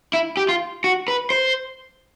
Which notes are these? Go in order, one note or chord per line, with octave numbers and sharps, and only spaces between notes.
E4
G4
F4
F#4
B4
C5